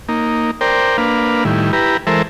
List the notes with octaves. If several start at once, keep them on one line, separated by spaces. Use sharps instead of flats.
A#3 D#4
A#4 C5 D5 G5
A#3 D4 B4 F5
A2 D#3 G3 E4
E4 G4 B4 A#5
E3 G#3 A4 A#4 C5 E5